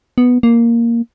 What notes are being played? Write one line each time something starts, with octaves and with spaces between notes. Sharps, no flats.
B3
A#3